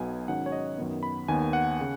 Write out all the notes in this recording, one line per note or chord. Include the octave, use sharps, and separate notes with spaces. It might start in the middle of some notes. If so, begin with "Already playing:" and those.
Already playing: B1 B2 B3 G#5
G#2 D#3 F#3 C#4 F#5
C#5
D#5
F#2 D#3 B3
B5
D#2 D#3 B3 G#5
F#5
C#3